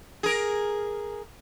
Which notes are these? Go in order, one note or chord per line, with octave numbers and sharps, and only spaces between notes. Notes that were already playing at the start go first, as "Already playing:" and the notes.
G#4 A#4